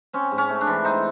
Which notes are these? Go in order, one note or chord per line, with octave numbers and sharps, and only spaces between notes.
C4 C#4
G#2
C#4
A3
D4
E3
C4 D#4